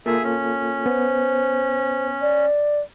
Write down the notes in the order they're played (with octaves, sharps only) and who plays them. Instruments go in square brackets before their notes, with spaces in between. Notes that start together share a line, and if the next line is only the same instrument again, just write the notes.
[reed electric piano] A#3 F4 A4 [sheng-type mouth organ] G#4 E5
[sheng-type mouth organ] C#4
[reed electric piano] B3 [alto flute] C5
[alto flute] D5